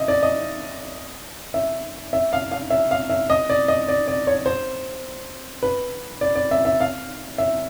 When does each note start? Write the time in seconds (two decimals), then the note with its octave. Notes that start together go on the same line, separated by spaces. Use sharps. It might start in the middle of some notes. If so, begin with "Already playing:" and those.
Already playing: D#5 E5
0.08 D5
0.23 D#5
1.54 E5
2.13 E5
2.33 F5
2.52 F5
2.70 E5
2.91 F5
3.10 E5
3.30 D#5
3.50 D5
3.68 D#5
3.88 D5
4.08 D5
4.27 C#5
4.46 C5
5.63 B4
6.21 D5
6.35 D5
6.51 E5
6.65 E5
6.80 F5
7.38 E5